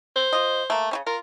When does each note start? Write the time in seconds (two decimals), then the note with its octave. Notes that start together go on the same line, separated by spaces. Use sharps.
0.16 C5
0.33 F4 D#5
0.70 A3 A#3
0.91 C#3 G3 C#4
1.07 F4 A#4